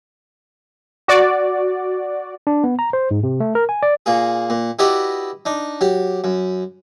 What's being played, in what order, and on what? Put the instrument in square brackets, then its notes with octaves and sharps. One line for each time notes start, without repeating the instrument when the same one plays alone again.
[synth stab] F#4 D5
[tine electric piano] D4
B3
A#5
C5
G#2
C3
A3
A#4
G#5
D5
[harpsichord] A#2 A#3 G#4
A#2
E4 F#4 G4 B4 D5 D#5
D4 D#4
F#3 G4
F#2